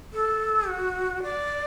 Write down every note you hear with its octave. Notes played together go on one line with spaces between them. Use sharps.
A4
F#4
D5